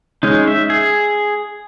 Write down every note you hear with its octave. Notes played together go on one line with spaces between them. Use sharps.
G#3 C#4 D#4
E5
G#4